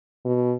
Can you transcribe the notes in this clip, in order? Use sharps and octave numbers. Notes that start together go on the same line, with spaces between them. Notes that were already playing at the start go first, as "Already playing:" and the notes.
B2